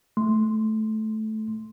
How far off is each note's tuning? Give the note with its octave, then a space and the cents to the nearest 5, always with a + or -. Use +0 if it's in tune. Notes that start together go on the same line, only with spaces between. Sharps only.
A3 -15 C6 +0